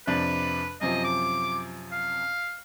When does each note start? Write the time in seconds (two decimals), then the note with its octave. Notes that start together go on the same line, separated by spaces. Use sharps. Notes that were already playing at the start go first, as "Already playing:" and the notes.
0.07 F2 C3 D4 B4
0.81 F#2 C3 F3 D#5
1.04 D6
1.92 F5